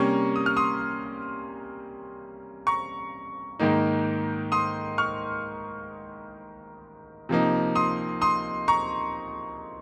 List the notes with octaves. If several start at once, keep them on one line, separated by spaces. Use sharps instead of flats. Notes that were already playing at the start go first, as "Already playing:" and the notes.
Already playing: C3 G3 A#3 C#4 A#5 C#6
D#6
F6
C6 D#6
A#5 C#6
G#2 D#3 A#3 D#4
C6 D#6
C#6 F6
C3 F3 A#3 D#4
C6 D#6
C6 D#6
A#5 C#6